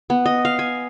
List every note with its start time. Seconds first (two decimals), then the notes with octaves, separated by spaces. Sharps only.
0.10 B3
0.26 D#5
0.45 F5
0.59 G#5